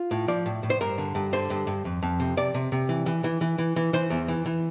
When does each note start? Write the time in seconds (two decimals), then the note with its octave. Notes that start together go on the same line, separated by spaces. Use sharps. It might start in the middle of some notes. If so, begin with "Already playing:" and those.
Already playing: F4
0.11 A2
0.28 F3 D5
0.46 A2
0.63 A2
0.70 C5
0.81 G2 A#4
0.98 D3
1.15 G2
1.33 D3 C5
1.50 G2
1.67 G2
1.85 F2
2.03 F2
2.20 C3
2.37 C3 D5
2.54 C3
2.72 C3
2.89 E3
3.06 E3
3.24 E3
3.41 E3
3.58 E3
3.76 E3
3.93 E3 C5
4.10 E2
4.28 E3
4.46 E3